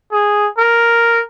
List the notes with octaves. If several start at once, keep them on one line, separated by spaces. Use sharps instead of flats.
G#4
A#4